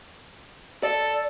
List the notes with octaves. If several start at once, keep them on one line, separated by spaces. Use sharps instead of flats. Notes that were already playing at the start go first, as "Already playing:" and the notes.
A4 D5